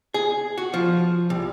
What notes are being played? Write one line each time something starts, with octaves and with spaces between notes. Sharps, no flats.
G#4
F#4
F3
C2